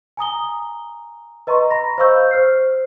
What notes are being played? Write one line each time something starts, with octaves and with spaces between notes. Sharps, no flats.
G#5 A#5 D#6 G7
B4 D#5 A#5 C6 C#6
A#5 B5 A#6
C5 D#5 F5 C#6 E6 G6
C5 F6 C7